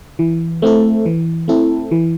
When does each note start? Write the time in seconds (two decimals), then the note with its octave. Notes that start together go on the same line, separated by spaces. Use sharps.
0.19 E3
0.62 A3 C4 E4 A4
1.06 E3
1.48 A3 C4 E4 A4
1.91 E3